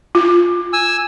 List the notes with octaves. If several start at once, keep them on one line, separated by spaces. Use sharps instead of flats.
F4
G#5 E6